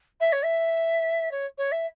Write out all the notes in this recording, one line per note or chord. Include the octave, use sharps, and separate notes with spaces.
E5
C#5
E5
C#5
C#5
E5